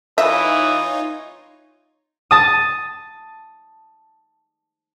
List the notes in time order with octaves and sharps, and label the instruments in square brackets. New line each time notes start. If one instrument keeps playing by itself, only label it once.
[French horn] E3 [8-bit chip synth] D#4 F4 C#5 [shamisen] E5 [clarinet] D#6
[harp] A5 D#6